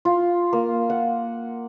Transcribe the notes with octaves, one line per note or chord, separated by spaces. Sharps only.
F4
A#3
F#5